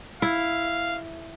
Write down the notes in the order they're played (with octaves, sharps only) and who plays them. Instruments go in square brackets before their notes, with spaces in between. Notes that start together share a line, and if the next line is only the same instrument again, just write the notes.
[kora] E4 [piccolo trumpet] F5